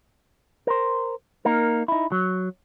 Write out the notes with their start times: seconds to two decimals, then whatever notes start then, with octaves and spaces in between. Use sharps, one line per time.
0.67 A#4 C5
1.45 A#3 D#4 A#4
1.88 D#4 E4
2.12 F#3